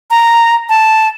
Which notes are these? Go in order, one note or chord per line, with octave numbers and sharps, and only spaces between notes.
A#5
A5